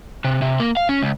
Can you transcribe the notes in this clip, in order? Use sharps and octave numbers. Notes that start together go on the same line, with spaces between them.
C3
C3
A#3
F5
C#4
C#2